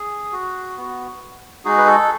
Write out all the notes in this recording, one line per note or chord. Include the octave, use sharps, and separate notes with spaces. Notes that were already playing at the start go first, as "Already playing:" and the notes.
Already playing: G#4
F#4
B3 F#4
G#3 D#4 F#4 G#4
B4
A4